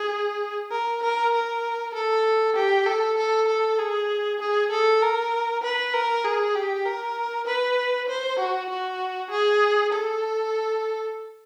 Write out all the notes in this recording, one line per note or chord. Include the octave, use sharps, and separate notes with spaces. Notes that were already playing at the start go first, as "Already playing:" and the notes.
Already playing: G#4
A#4
A#4
A#4
A4
G4
A4
A4
A4
G#4
G#4
A4
A#4
B4
A#4
G#4
G4
A#4
B4
C5
F#4
F#4
G#4
A4